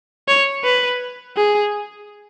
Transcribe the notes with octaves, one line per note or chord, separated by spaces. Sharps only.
C#5
B4
G#4